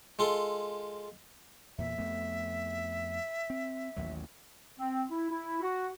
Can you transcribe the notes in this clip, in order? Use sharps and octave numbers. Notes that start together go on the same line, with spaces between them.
G#3 F4 A4
E2 A#2 E5
F2 A3 B3
C4
A1 D#2 F#3
C4
E4
E4
F#4